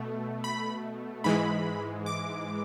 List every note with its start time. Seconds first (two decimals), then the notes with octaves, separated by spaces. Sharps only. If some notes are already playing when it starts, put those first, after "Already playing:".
Already playing: B2 A3
0.44 B5
1.24 G#2 E3 G#3 B5
2.06 D6